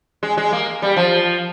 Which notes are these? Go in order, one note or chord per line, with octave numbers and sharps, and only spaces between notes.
G#3
G#3
A#3
G3
F3